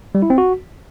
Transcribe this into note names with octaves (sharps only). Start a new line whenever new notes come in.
G3
E4
C4
F#4